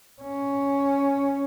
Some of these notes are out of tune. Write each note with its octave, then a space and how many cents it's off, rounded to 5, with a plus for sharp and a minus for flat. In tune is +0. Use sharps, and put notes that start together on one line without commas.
C#4 +5